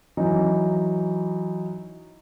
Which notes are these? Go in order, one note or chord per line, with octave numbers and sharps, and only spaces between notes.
E3 F#3 D#4